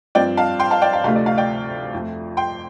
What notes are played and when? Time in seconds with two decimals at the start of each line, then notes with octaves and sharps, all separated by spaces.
0.15 G2 F3 C4 D5 G5
0.37 F5 A5
0.60 G5 C6
0.71 F5 A5
0.82 D5 G5
0.93 F5
1.04 D2 C3 F3 A3 F5
1.15 D5
1.26 F5
1.37 D5 G5
1.93 F2 F3 A3
2.37 G5 C6